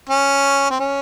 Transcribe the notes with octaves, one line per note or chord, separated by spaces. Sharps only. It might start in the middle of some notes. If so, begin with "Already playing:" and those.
C#4
C4
C#4